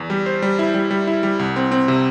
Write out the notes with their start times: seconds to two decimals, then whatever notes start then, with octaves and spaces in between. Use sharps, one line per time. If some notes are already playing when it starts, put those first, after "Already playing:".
Already playing: E2
0.10 G3
0.26 C5
0.42 G3
0.59 E4
0.74 G3
0.91 G3
1.07 E4
1.23 G3
1.39 C2
1.56 C4
1.72 C4
1.88 C3